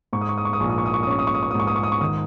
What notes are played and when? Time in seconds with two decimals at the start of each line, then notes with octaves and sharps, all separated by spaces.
0.13 G#2 C#6
0.21 D#6
0.29 C#6
0.38 D#6
0.45 C#6
0.53 D#6
0.60 A#1 C#6
0.69 D#6
0.78 C#6
0.86 D#6
0.94 C#6
1.03 D#6
1.07 C#4 C#6
1.19 D#6
1.27 C#6
1.34 D#6
1.43 C#6
1.51 D#6
1.54 G#2
1.60 C#6
1.67 D#6
1.76 C#6
1.83 D#6
1.92 C#6
2.01 D#3 D#6